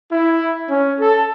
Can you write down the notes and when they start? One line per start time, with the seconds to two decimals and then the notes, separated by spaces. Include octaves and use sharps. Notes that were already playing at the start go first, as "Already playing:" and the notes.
0.12 E4
0.69 C#4
0.99 A4